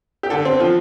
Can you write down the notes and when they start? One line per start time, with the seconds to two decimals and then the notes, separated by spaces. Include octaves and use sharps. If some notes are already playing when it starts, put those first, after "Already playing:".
0.23 G4
0.30 D3 A4
0.45 C4
0.60 F3